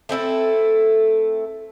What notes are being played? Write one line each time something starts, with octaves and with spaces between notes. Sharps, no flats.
A3 C4 E4 A4